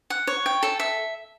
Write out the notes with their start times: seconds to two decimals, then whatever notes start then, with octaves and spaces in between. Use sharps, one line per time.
0.10 F#5
0.27 C#5
0.46 G5
0.63 A4
0.80 E5